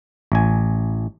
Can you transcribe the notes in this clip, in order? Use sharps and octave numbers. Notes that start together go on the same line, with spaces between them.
A1 G#5